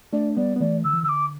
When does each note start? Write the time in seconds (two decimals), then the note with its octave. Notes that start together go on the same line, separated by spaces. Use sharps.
0.13 A3 D4 D5
0.37 G3 B3 D5
0.56 B3
0.60 E3 A3 D5
0.84 D3 E6
0.93 E3
1.03 D3 E6
1.09 D6